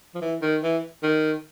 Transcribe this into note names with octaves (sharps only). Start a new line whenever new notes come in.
F3
E3
D#3
E3
D#3